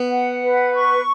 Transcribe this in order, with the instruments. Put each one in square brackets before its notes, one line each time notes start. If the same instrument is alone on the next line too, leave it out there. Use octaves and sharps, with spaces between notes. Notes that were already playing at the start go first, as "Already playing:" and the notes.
Already playing: [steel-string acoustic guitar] B3
[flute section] F#5
B4
C#6